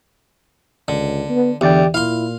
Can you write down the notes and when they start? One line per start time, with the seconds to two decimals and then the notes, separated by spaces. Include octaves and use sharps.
0.88 C#2 D3
1.29 B3
1.61 E2 D3 G4 D5 G5
1.94 A#2 E4 F5 C6